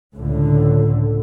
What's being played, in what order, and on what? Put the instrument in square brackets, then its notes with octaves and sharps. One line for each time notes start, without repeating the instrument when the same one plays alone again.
[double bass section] C#2 A2 D3